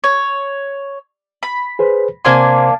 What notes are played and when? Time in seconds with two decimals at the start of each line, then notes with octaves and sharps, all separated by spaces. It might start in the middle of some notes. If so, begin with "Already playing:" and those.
0.04 C#5
1.43 B5
1.79 G#4 B4 C5
2.25 C3 A#3 D4 C5 G#5 C6